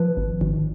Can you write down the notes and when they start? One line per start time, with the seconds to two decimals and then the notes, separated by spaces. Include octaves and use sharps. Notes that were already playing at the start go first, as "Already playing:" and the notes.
Already playing: F3 B4
0.17 G#1
0.41 G#1